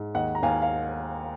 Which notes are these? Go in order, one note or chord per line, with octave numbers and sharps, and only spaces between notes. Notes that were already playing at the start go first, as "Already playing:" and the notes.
Already playing: G#2
D#2 D#5 F#5
A#5
D#2 F5 G#5
F5